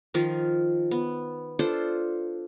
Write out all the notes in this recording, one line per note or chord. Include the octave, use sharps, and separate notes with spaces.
D#3 F3 F4
B3
D4 F4 A4 C5